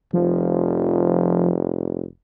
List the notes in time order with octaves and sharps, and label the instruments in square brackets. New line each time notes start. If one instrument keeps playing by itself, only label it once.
[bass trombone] F1 [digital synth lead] F3